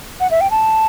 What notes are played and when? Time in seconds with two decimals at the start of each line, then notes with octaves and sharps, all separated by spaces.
0.20 F#5
0.31 E5
0.41 G5
0.51 A5